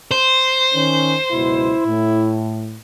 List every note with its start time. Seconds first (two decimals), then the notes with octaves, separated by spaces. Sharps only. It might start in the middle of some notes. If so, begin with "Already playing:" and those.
0.11 C5
0.73 D#3 C#4
1.32 C#2 F#2 B2 E4
1.85 A2